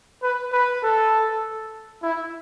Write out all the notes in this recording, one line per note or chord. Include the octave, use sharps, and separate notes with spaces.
B4
B4
A4
E4